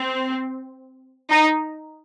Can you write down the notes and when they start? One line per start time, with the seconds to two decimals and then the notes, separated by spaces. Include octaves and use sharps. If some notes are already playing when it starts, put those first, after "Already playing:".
Already playing: C4
1.30 D#4